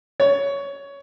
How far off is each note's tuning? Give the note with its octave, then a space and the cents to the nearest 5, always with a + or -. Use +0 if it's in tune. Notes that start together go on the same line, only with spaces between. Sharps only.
C#5 +15